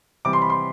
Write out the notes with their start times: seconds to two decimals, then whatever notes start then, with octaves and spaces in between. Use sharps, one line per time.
0.25 C3 E3 G3 D6
0.33 C6
0.42 B5
0.50 C6